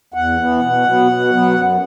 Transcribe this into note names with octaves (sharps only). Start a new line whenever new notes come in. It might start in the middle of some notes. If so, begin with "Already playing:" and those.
E2 F#5
E3 B3
B2
F#3 B3
B2
F#3 B3
F#2